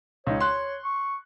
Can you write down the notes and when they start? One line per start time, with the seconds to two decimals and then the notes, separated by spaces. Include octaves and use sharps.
0.27 C#2 D#4 C#5
0.41 C6 F#6
0.84 C#6